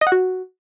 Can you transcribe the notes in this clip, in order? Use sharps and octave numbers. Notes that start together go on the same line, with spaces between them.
D#5
F#5
F#4